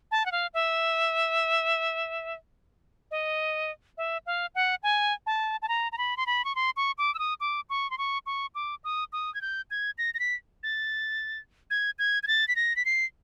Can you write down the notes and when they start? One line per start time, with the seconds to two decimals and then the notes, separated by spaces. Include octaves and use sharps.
0.11 A5
0.26 F#5
0.32 F5
0.54 E5
3.11 D#5
3.97 E5
4.26 F5
4.55 F#5
4.83 G#5
5.26 A5
5.62 A5
5.69 A#5
5.92 A#5
5.98 B5
6.17 C6
6.26 B5
6.45 C#6
6.55 C6
6.77 C#6
6.98 D6
7.14 E6
7.19 D#6
7.40 D6
7.70 C#6
7.91 C6
7.98 C#6
8.26 C#6
8.55 D6
8.84 D#6
9.13 D#6
9.34 G#6
9.41 G6
9.71 G#6
9.98 A#6
10.14 A#6
10.19 B6
10.63 A6
11.70 G#6
11.99 G#6
12.23 G#6
12.27 A6
12.48 B6
12.56 A#6
12.76 B6
12.85 C7